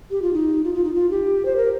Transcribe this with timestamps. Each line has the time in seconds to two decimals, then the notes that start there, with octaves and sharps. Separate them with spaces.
0.11 G4
0.22 F4
0.33 D#4
0.64 F4
0.74 F4
0.84 D#4
0.95 F4
1.11 G4
1.46 C5
1.56 A#4